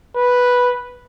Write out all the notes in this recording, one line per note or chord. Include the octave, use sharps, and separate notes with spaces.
B4